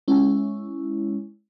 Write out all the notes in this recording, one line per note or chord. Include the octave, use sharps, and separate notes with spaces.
G#3 C#4 E4